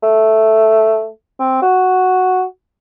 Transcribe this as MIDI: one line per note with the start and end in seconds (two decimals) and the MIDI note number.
0.03 1.08 57
1.39 1.58 60
1.62 2.43 66